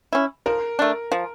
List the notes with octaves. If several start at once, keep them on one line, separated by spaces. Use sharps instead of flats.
C#4 E4
F3 A#4
A3 D4
F3